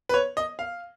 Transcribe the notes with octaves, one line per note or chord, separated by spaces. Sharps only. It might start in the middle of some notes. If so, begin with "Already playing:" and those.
B4
C#5
D#5
F5